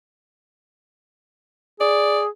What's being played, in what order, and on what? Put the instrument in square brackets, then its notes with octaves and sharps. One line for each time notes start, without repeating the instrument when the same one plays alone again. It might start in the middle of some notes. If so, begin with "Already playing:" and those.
[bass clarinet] G#4 [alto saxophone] D5